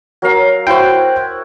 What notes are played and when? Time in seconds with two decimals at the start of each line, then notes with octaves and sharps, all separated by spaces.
0.22 F#3 A#4 F5
0.67 E4 F#4 C5 F#5 G5